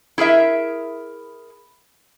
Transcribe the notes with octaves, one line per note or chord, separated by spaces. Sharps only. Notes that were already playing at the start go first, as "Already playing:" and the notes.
E4 G#4 A#4 E5